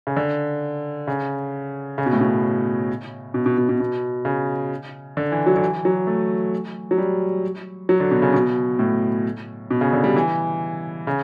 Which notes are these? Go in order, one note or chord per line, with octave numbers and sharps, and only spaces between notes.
C#3
D3
C#3
C#3
B2
A2
B2
B2
B2
B2
B2
B2
C#3
D3
E3
F#3
D3
E3
F#3
A3
F#3
G3
F#3
D3
B2
C#3
B2
A2
B2
C#3
D3
G3
E3
C#3